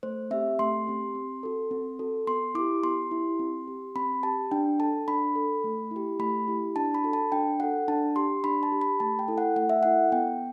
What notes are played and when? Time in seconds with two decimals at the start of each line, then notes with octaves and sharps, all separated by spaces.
0.03 A3 C5
0.31 C4 G4 E5
0.59 A3 C6
0.87 C4 G4
1.15 C4
1.43 F#4 A4
1.71 C4
1.99 F#4 A4
2.27 B3 C6
2.55 E4 G4 D6
2.83 B3 C6
3.11 E4 G4
3.39 C4
3.68 G4
3.95 C4 B5
4.23 G4 A5
4.51 D4 G5
4.80 A4 A5
5.08 D4 B5
5.35 A4
5.64 A3
5.91 E4 G4
6.19 A3 B5
6.48 E4 G4
6.76 D4 A5
6.94 B5
7.04 F#4 A4
7.13 A5
7.32 D4 G5
7.60 F#4 A4 F#5
7.88 D4 A5
8.16 G4 C6
8.44 D4 B5
8.63 A5
8.72 G4
8.81 B5
9.00 A3 A5
9.19 G5
9.28 E4 A4
9.38 F#5
9.56 A3 F#5
9.69 E5
9.83 E4 A4 F#5
10.12 B3 G5